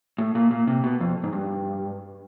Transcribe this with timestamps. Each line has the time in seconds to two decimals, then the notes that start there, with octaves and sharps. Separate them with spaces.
0.18 A2
0.35 A#2
0.51 A#2
0.67 C3
0.84 B2
1.00 F2
1.24 G#2
1.33 G2